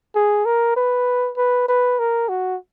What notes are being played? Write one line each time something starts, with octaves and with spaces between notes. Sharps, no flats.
G#4
A#4
B4
B4
B4
A#4
F#4